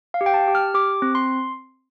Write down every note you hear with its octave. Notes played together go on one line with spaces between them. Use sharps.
F5
G4
G5
A5
G4
F6
G4 D6
C4
C6